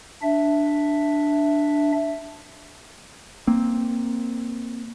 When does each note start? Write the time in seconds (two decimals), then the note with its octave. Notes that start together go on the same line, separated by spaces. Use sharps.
0.22 D4 E5
3.47 A#3 C4